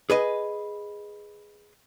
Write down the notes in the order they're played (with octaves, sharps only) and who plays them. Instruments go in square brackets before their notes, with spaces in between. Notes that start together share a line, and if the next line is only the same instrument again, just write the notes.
[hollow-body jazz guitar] G#4 B4 D#5